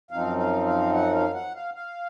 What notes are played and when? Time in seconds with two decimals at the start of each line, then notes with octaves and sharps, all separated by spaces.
0.11 F#2 F3 C4 D#4 F5
0.38 F5
0.66 F5
0.93 F#5
1.13 F5
1.34 F#5
1.55 F5
1.74 F5